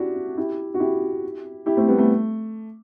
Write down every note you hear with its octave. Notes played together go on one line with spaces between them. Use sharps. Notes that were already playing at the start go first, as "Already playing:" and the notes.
Already playing: D4 E4 F#4 G4
E4 G4
F#4
E4 G4
E4 G4
A3 C4
G3 B3
A3